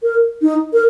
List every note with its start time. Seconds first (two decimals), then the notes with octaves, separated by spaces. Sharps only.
0.03 A#4
0.42 D#4
0.73 A#4